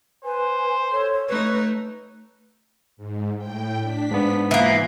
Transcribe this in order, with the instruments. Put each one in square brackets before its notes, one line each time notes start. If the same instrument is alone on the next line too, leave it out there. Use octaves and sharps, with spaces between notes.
[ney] B4 [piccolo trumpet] C5 [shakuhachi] G#5
[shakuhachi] A4 [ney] C#5
[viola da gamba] A3 D#4 [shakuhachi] B4 [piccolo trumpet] C#6
[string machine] G#2
A2 G5
D4 B6
[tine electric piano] G#2 B3
[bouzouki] E3 A#3 [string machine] D#4 F4 G#5